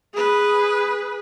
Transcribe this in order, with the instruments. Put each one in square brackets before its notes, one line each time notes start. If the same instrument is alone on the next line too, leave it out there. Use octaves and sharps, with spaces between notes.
[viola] G#4 B4